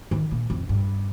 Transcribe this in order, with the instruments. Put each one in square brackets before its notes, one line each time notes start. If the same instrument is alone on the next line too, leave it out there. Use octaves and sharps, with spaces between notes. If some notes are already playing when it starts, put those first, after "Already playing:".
[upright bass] D#3
A#2
F2
G2